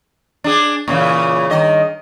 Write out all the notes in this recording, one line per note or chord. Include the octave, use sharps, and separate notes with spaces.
D4 G#4
A#2 C#3 E3
G2 D#3 D#5